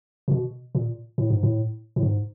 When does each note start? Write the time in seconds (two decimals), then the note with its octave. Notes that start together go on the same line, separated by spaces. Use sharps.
0.28 A#2
0.31 B2
0.75 A#2
1.18 A2
1.30 G#2
1.43 A2
1.96 A2
2.03 G#2